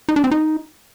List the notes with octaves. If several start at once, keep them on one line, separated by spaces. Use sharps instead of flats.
D#4
D4
C4
D#4